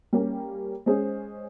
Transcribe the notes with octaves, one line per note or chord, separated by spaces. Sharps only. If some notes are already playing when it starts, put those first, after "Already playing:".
G3 A#3 C#4 G4
G#3 C#4 G#4 C5